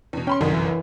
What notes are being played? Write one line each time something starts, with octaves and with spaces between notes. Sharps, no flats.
E2 B2
C#4 G5 B5 C6
G1 C2 F#2 D#3
E3